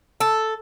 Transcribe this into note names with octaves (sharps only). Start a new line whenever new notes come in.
A4